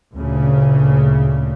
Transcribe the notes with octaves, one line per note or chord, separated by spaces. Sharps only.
D2 A#2 C#3